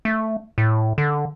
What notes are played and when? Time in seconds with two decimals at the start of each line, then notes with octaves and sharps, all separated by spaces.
0.05 A3
0.58 A2
0.98 D3